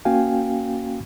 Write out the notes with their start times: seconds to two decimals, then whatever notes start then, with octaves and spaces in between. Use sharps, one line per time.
0.05 A#3 C#4 F#4 F5 G5 G#5